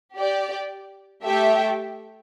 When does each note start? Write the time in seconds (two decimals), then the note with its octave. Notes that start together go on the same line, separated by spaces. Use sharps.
0.16 G4 D5 G5
1.24 A3 G4 E5 G5